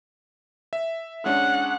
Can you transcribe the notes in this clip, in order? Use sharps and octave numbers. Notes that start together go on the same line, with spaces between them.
E5
G#3 C#4 D4 F#5